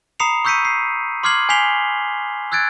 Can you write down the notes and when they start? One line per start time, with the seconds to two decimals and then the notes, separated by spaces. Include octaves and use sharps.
0.20 A#5 B5 D#6 C7 C#7 F7
0.45 C#6 E6 G6 B6 C#7 D#7
0.65 C7
1.23 C6 D6 F6 G#6 C7 F#7
1.49 G#5 G6 B6 C7 F7 G7
2.52 E6 F#6 G#6 A6 D7